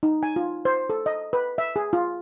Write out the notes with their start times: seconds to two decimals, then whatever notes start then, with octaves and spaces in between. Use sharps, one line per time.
0.03 D#4
0.23 G#5
0.36 F4
0.65 C5
0.90 A4
1.06 D#5
1.33 B4
1.58 E5
1.76 G#4
1.93 F4